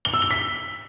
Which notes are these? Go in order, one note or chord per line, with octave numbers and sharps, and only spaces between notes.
G7
E6
G7
B6